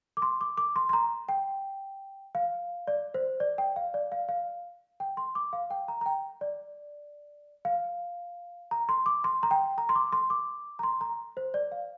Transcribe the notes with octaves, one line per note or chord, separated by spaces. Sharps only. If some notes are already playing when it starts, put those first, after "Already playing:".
D6
C6
D6
D6
C6
C6
A#5
G5
F5
D5
C5
D5
G5
F5
D5
F5
F5
G5
C6
D6
F5
G5
A#5
A#5
G5
D5
F5
A#5
C6
D6
C6
A#5
G5
A#5
C6
D6
C6
D6
A#5
C6
A#5
C5
D5
F5